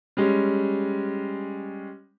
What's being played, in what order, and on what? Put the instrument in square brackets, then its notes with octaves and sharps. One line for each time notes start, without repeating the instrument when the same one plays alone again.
[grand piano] G3 G#3 C#4